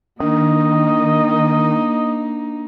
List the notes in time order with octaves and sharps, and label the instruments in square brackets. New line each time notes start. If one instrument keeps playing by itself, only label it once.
[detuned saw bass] D#3 [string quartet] A#3 D#4 [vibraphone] D4 [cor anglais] D#5